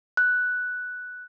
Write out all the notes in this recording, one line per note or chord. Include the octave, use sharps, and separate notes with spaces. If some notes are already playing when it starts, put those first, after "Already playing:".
F#6